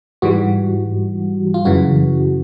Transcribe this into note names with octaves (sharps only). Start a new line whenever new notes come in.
G#2 E3 G3 F#4
F4
F#2 C#3 E3 F#4